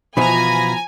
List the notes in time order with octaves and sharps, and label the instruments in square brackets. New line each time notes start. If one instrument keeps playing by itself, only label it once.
[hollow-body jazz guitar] B2 E3 [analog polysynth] F3 A#5 [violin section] G#5 [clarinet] B5